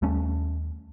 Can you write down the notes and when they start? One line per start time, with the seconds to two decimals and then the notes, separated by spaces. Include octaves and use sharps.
0.02 D#2 G3 A3 C#4